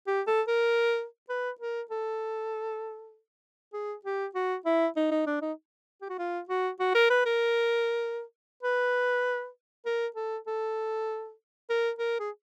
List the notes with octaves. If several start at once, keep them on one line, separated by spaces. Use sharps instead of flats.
G4
A4
A#4
B4
A#4
A4
G#4
G4
F#4
E4
D#4
D#4
D4
D#4
G4
F#4
F4
F#4
F#4
A#4
B4
A#4
B4
A#4
A4
A4
A#4
A#4
G#4